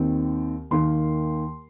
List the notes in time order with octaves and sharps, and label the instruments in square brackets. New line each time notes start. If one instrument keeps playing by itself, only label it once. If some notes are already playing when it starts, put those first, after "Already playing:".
Already playing: [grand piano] D#2 D#3 C4
D#2 D#3 A#3 C6